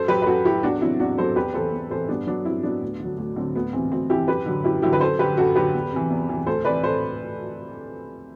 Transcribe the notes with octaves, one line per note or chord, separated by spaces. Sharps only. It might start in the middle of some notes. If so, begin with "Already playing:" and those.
Already playing: F#2 A4 C5
F#3 G4 B4
B4
F#2 F#4 A4
F#3 E4 G4
E2 D4 F#4
C3 F#3 C4 E4
E2 D4 F#4
C3 F#3 A4 C5
E2 G4 B4
C3 E3 A4 C5
E2
C3 E3 A4 C5
G2 B3 D4
F#3 B3 D4
G2 C4 E4
F#3 B3 D4
D2
D3 F#3
D2
D3 F#3 C4
D2 B3
C3 E3 C4
D2 C4
C3 E3 E4 G4
F#2 G4 B4
D3 F#3
F#2 E4 G4
D3 F#3 E4 G4
B4
F#2 A4 C5
D3 F#3 G4 B4
F#2 F#4 A4
D3 F#3 G4 B4
E2
C3 E3
E2
C3 E3
D2 A4 C5
C3 E3 B4 D5
A4 C5